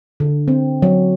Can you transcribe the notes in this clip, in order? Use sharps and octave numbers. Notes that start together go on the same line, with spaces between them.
D3
C4
F#3